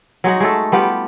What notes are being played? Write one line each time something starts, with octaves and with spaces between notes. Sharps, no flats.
F#3 G#3 D#4 F#4
G#3 A3 A4
G3 B3 F4 G4